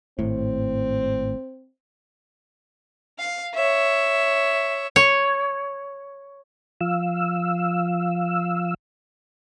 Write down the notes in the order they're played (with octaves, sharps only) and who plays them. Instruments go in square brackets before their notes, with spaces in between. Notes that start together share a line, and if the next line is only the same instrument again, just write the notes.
[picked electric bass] G#1 A2 [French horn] C4
[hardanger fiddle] F5
C#5 E5
[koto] C#5
[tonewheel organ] F3 F5 E6